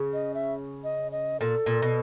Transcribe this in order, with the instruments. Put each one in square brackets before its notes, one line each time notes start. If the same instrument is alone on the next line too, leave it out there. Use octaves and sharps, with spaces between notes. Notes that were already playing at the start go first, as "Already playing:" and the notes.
Already playing: [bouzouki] C#3
[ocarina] D#5
E5
D#5
D#5
[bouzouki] A#2 [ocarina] A4
[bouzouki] A#2
B2